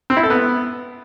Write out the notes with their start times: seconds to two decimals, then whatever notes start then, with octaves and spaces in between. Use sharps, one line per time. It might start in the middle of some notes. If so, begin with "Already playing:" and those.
0.10 C4
0.17 E4
0.23 A4
0.30 B3